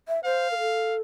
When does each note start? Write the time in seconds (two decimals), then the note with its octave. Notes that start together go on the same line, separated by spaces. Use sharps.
0.08 E5
0.24 C5 F5
0.51 A#4
0.59 A4